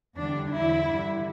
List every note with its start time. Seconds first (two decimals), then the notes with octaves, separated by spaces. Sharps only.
0.18 E2 D3 G3 D4
0.52 E2 D3 F#3 E4
0.88 G2 D3 G3